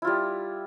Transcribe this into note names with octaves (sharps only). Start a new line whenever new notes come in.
G3 E4 F4